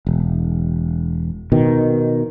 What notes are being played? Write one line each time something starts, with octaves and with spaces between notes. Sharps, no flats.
E1
B2 D#3